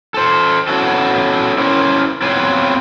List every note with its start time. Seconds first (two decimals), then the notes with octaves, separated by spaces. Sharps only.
0.14 A4 C5
0.68 B3 C#4 E4 F#4 A4
1.58 C#4 E4 A#4 C5
2.22 B3 C4 F4 G#4 B4 C#5